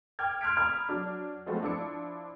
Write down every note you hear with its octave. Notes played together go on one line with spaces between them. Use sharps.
G5 D6 F6 G#6
C6 F6 F#6 G#6 B6 D7
A#5 B5 D#6 F6 F#6 G#6
F#3 D4
F3 G#3 A3 B3 C4 F#4
F3 D4 E4 E6 C#7